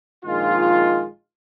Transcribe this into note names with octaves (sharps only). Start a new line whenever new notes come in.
A#1 D#3 G#3 F4